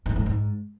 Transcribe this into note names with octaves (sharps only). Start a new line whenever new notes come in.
G#2
A2
G#2